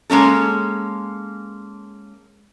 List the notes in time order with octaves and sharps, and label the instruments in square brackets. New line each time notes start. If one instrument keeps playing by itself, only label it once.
[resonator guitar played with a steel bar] G#3 A#3 C#4 A4